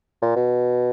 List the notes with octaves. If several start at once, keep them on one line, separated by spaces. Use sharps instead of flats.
A#2
B2